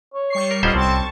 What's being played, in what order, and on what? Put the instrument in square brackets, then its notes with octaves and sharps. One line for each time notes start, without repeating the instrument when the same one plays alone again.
[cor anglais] C#5
[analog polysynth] G3 C#6 C7
[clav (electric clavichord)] A#4
[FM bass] D1 [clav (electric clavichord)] G3 C#4 C5 [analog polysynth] F4 A4 F#5 [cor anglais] D#5
[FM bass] C2 [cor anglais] C4 [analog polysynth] A5 C#6